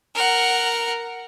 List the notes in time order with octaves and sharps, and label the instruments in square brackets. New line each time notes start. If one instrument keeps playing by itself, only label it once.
[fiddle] A#4 F#5